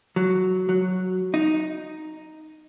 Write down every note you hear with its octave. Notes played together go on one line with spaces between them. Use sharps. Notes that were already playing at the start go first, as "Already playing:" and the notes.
F#3
F#3
D#4